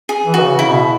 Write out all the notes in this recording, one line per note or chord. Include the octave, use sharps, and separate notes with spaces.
G#4
E3
F#4
C#3
C#3 E4
B2